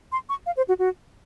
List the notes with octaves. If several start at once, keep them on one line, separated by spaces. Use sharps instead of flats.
C6
C#6
F5
C5
F#4
F#4